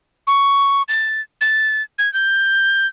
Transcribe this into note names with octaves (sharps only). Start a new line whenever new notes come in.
C#6
A6
A6
G#6
G6